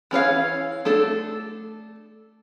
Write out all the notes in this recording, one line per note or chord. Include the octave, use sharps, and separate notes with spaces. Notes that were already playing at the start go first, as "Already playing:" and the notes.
E3 C#4 C#5 F5
A3 D4 A4